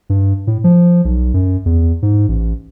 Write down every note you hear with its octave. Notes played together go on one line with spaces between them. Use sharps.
G2
A2
F3
B1
F#2
E2
G#2
A1